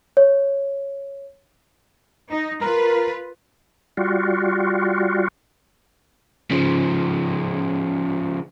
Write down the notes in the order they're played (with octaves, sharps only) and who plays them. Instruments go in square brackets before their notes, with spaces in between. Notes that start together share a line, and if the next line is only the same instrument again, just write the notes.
[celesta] C#5
[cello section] D#4
[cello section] F4 B4 [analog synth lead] A#4
[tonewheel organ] G3 F4 F#4
[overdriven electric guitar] C#3 F3